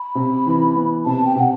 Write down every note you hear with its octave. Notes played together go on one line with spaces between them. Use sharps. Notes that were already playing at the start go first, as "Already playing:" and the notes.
Already playing: B5
C3
E3
B3
C3 A5
G5
C3 F#5